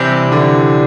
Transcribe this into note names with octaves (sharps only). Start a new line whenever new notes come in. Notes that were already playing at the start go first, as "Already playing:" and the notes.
Already playing: C3 E3 G3 D4 G4
D3